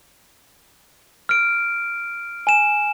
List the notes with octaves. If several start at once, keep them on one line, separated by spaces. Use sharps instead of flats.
F6 D7
G#5 E7